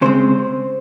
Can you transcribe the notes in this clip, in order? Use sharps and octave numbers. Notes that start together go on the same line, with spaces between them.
C#3 G#3 C4 C5